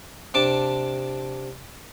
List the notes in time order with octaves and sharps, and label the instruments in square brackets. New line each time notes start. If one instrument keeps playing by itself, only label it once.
[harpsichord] C3 D4 A5 D6